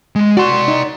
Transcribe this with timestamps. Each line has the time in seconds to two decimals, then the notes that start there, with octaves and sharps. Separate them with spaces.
0.16 G#3
0.37 F#4 D5 C6
0.68 D#4